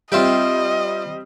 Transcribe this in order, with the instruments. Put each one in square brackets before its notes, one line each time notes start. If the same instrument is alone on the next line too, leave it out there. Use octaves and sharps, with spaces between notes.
[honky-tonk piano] G3 C4 [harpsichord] F4 E5 G5 [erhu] D#5